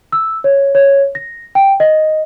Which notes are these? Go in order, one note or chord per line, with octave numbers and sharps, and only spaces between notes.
E6
C#5
C#5
A#6
G5
D#5